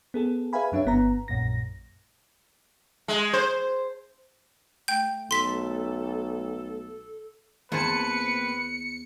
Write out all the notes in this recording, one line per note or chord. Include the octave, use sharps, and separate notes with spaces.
B3 G#4 A4
G#4 B4 E5 F5 G#5 B5
F#2 F#3 D4 C#5 E5
G1 B3 A#5
A#1 F#2 A#2 A#6
G#3
C5
A3 G5 G6
B1 A4 C6 B6
E2 A#3 C4 B4 C5 A5 C#7